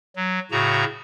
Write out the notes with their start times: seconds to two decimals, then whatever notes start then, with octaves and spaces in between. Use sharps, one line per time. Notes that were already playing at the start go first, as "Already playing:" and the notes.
0.16 F#3
0.51 A2 C#3 F#4 A#5